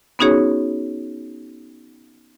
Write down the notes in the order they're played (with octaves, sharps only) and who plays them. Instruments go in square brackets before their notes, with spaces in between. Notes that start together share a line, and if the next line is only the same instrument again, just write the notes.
[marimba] B3 C#4 D#4 F#4 G#4 C#5